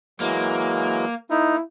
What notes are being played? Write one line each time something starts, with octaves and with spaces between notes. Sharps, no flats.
E3 F#3 G#3 A#3
A#3 D#4 E4